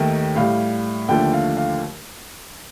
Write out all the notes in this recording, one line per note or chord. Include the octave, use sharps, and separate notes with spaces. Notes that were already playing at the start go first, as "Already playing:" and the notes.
Already playing: D#2 D#3 A3 G5
A2 G3 F5
D#2 D3 F3 A3 G5
F5
F5